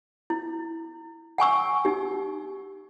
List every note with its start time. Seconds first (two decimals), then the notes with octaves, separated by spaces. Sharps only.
0.30 E4
1.38 F#5 G#5 C#6 E6
1.85 D#4 G4